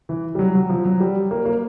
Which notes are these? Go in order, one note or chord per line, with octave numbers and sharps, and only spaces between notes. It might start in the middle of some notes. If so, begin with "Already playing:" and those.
E3
G3
F#3
F#3
F3
F#3
G3
A#3
A#3